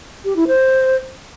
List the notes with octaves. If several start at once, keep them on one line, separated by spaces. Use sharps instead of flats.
G4
E4
C5